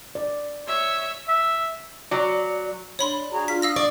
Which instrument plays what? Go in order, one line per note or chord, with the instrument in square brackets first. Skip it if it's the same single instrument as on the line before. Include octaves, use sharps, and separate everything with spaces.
[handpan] D5
[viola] C#5 E5
[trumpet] E5
[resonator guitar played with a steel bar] F#3 [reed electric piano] D5
[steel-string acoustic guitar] D4 [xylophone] C#5 B5 C6
[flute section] F#4 G#4 A#5
[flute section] F4 F6 [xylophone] B6
[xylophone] F5 E6 A#6 [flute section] D#6
[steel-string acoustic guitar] D5 [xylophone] C#6